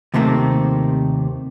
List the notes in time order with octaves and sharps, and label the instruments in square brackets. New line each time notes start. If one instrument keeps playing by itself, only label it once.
[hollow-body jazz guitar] D#2 C3 D#3 A3 A#3 C4